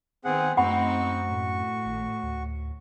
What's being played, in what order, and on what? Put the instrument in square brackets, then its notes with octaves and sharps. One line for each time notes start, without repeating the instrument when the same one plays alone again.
[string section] D#3 B3 [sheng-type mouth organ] C4 G#4 F#5
[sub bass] F#2 [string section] A3 C4 D#4 [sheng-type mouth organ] F#4 C#6 [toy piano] F#5 B5
[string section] A2
[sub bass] G#1
D2